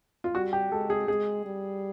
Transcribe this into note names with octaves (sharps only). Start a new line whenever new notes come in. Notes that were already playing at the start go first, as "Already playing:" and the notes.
F4
G3 F#4
G4
G#3 A4
G#4
G#3 G#4
G3